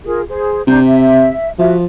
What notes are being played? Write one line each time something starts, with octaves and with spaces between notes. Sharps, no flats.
F4 G#4 A#4
G#4 C5
C3 D4 A#5 G6
E5
F3 F#4 E5